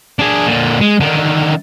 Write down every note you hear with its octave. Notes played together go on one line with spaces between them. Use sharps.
D4 G#4
A#2 D3
G#3
D3 D#3